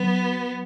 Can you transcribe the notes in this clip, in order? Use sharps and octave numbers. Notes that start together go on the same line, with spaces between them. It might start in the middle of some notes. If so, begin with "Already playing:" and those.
Already playing: F#3 B3